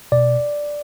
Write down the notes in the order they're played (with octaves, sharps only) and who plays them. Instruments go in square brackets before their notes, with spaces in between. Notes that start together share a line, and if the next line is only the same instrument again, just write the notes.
[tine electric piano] B2 D5